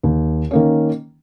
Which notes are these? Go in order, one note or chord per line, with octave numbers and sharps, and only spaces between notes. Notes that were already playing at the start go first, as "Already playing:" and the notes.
D#2
D#3 A#3 C#4